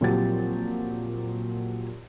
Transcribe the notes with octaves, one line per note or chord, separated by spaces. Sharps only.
A#2 F3 F#3 C4 G4 A6